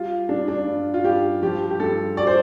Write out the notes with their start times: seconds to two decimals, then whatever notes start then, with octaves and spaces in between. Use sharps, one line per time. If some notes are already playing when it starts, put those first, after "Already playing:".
Already playing: G3 F4
0.29 G3 D4
0.48 D4
0.67 G2
0.94 F4
1.04 G2 G4
1.42 F3 G4
1.70 G4
1.80 G2 A4
2.17 D5
2.27 C5